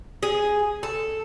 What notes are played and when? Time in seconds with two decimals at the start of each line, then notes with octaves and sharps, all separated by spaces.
0.23 G#4
0.83 A4